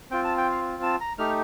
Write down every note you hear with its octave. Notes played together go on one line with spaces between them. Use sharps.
C4 F4 G5
A5
G5
F5
A5
A#5
A3 D#4 G4 F6